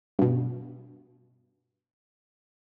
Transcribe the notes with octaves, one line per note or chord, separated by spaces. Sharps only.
G2 B2